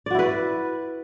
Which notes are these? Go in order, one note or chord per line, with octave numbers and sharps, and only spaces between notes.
E4 F#4 B4 D5